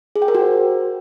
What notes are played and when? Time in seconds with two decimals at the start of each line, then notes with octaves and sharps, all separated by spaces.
0.16 G#4
0.22 G5
0.28 A#4
0.35 F#4
0.41 C5